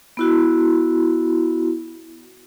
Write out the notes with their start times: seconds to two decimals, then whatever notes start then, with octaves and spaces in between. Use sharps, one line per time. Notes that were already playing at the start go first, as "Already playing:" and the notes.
0.17 B3 E4 F#4